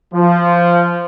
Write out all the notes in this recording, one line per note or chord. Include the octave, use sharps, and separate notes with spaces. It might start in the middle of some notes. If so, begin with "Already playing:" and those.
F3